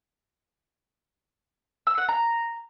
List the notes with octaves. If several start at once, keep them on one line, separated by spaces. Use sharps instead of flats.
E6
F#5
A#5